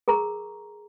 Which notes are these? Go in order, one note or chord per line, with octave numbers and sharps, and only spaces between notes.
G#4 A#4 A#5 C#6